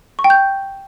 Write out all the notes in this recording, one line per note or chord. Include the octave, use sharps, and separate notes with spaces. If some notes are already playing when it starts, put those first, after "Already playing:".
C#6
G5
G6